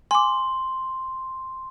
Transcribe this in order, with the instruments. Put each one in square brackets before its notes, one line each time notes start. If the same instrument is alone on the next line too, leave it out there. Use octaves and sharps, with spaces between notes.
[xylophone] G#5 D6 [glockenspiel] C6